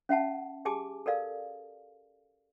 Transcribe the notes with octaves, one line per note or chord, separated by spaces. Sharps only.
C#4 E5 F#5 A5
G4 G#4 G#5 A5 D6
A4 A#4 D5 F5